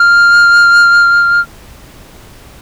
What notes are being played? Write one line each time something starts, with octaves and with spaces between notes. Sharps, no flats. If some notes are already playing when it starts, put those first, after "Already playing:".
Already playing: F6